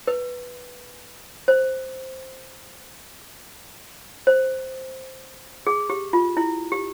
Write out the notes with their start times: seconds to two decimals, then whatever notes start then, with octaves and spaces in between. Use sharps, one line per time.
0.07 B4
1.48 C5
4.27 C5
5.67 G#4
5.90 G4
6.13 F4
6.37 E4
6.72 G4